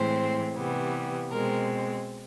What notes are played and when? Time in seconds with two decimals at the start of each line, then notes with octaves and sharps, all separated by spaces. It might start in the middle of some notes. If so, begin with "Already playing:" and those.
Already playing: A2 E3 G#3 C4 C5
0.55 C3 E3 G3 B3
1.30 B2 G#3 C4 A#4